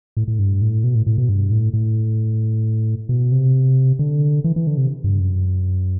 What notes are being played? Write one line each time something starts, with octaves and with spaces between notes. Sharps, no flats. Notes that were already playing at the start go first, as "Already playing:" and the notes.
A2
A2
G2
A2
B2
A2
A2
B2
G2
A2
A2
B2
C3
D3
E3
E3
D3
C3
G2
F#2